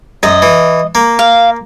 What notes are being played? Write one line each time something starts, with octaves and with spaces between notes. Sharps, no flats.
F#2 D#5
E3
A#3
F5